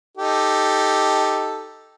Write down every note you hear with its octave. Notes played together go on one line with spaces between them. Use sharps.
D#4 G4 A4